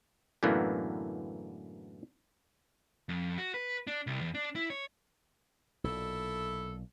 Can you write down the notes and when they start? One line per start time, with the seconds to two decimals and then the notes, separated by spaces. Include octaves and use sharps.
0.43 F#2 A2 D3 E3 A#3 B3
3.09 F2
3.38 F#4
3.54 B4
3.87 D4
4.07 C2
4.21 E2
4.34 D4
4.55 E4
4.70 C#5
5.84 B1 A#2 E4 A4